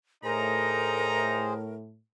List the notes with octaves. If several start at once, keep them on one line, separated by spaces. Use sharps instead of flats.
A2 D#4 G#4 A#4 C5 A#5